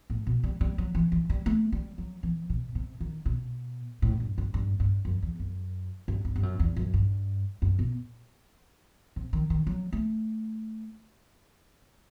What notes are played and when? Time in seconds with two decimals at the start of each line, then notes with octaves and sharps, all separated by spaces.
0.10 A2
0.27 B2
0.43 G3
0.61 G3
0.78 F#3
0.95 E3
1.12 E3
1.30 G3
1.46 A3
1.72 G3
1.98 F#3
2.23 E3
2.50 B2
2.75 C3
3.00 D#3
3.26 B2
4.02 A2
4.20 G2
4.38 G2
4.54 G2
4.80 G2
5.05 F#2
5.22 E2
5.40 F#2
6.08 G2
6.25 G2
6.36 G2
6.43 F#2
6.59 E2
6.76 F#2
6.94 G2
7.62 F#2
7.79 B2
9.16 C3
9.33 D#3
9.50 D#3
9.67 F#3
9.93 A3